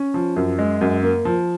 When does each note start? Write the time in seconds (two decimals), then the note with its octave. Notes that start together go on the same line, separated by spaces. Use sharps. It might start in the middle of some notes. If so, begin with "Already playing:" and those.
Already playing: C#4
0.14 F3
0.36 F#2
0.59 G#3
0.81 F#2
1.03 A#3
1.25 F3